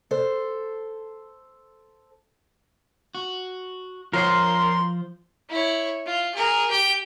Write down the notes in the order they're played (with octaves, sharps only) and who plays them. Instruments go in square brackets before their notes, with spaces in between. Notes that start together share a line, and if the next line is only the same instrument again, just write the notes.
[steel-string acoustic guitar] A4 C5
[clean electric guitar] F#4
[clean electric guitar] F3 C5 [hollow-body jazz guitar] F4 C#5 [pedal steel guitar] A#4 [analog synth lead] C6
[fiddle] E4 C#5
F4
G#4 A#4
G4 G5